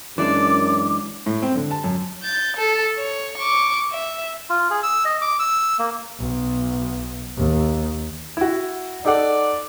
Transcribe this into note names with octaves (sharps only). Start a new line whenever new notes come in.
F#2 E3 G#3 D4 D5 D6
A2
C4
D3
A5
F#2
G6 A6
A4
C#5
C#6 D6
E5
F4
G#4
E6
D#5
D6
E6
A#3
B1
D#2
E4 F#4
D#4 A4 D5 F#5